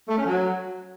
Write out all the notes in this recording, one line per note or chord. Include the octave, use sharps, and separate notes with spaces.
A3
C#4
F#3